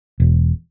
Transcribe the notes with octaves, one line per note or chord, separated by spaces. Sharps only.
E1